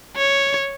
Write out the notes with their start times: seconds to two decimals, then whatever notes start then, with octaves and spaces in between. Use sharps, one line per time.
0.16 C#5